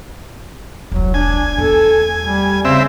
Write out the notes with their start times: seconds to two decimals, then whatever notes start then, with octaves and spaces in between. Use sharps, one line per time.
0.92 E1 C2 F#3
1.14 D4 G#5
1.58 E2 A3 A4
2.22 G3
2.65 C#3 C4 E5